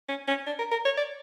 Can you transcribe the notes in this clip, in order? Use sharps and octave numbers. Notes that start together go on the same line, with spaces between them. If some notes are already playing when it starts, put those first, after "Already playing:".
C#4
C#4
D4
A#4
A#4
C#5
D5